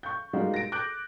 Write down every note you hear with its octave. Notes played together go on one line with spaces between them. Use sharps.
C#6 G6
G3 G#3 A#3 D#4 F4 F#4
A#6 D7
D6 F#6 G6 D7